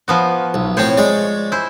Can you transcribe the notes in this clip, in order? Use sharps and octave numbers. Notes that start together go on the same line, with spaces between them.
F3 B3 F#4
B1
A2 C4 C5 C#5
G#3 D5
E4 C5